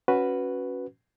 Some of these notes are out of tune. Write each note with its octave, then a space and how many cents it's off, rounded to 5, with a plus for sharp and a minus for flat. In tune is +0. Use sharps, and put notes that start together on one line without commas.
C#4 +0 F#4 +0 B4 +0